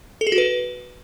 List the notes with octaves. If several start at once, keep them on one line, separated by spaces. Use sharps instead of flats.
A4
G#4
F#4
B4